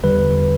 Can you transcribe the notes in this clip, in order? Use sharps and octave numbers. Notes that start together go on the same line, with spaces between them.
E2 D3 G3 B4